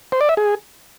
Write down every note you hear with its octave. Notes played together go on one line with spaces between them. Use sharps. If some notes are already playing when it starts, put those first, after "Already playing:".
C5
D5
E5
G#4